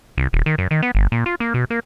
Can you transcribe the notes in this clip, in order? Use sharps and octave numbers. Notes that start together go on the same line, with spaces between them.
C2
D#1
D#3
F#2
D#3
B3
G1
A#2
F4
A#3
B2
A#3